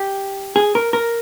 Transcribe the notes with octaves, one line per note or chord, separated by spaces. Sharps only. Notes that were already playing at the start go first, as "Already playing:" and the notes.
Already playing: G4
G#4
A#4
A#4